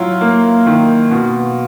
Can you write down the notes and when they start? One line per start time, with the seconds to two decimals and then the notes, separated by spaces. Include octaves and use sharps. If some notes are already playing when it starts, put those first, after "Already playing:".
Already playing: F#3 E4 F4
0.21 A#3
0.66 D#3
1.11 B2